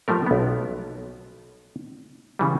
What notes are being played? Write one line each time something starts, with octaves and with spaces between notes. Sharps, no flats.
F3 G3 A3 A#4
B1 B3
C#3 E3 G3